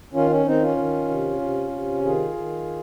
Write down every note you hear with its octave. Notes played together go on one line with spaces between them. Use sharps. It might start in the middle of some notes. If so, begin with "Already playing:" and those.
D#3 C#4 F4
C#4
D#3 C4 D#4
C#4 F4
D#3
C3
C3
C3
D#3 F4 G#4
D#3